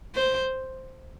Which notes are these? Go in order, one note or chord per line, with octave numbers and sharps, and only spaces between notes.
C5